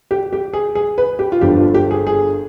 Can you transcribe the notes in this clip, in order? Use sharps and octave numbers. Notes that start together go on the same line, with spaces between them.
G4
G4
G#4
G#4
B4
G4
F4
G1 G2 F3 B3 D4 G4
F4
G4
G#4
G#4